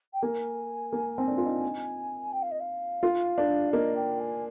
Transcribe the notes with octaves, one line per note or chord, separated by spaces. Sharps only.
G5
A#3 G#5
A#3
C4
D4
F4
D#4
G5
F5
D#5
F5
F4
D4
A#3 D#5
G5
G#5